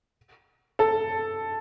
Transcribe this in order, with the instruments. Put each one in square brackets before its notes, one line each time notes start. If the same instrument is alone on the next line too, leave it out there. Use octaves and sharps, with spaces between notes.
[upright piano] A4